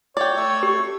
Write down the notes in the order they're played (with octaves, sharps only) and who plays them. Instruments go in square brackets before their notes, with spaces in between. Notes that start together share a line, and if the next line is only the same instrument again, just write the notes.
[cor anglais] C#5 [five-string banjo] D5 G5
[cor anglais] A3 [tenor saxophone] C#5
[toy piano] G4